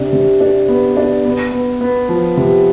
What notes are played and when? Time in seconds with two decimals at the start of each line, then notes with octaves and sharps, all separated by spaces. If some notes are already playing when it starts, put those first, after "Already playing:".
Already playing: C3 D4
0.13 C3
0.41 D4
0.68 B3
0.97 D4
1.25 B3
1.52 B3
1.81 B3
2.09 F3
2.37 C3